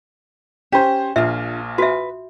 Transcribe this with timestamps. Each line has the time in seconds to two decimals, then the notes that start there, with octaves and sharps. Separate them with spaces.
0.72 C#4 G4 C5
1.16 A#1 A#2 D4 F4 E5
1.78 F#4 B4 E5